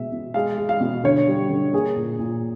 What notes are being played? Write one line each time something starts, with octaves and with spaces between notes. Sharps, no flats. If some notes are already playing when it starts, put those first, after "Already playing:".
Already playing: B2 G#3 E5
B2
G#3 F5
G#3
F5
B2
D3 C#5
G3
D3
A#3 G#4
A#2
A#2